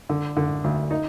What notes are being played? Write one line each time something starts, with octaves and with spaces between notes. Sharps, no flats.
D3
D3
D2
D#4